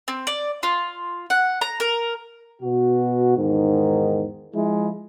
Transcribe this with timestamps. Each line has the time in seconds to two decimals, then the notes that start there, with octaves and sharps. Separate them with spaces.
0.08 C4
0.27 D5
0.63 F4
1.30 F#5
1.61 A#5
1.80 A#4
2.61 B2 F#4
3.37 E2 G#2 D#3
4.53 F3 G#3 E4